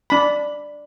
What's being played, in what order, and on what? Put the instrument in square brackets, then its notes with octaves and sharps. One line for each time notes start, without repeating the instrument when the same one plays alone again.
[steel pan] D4 B5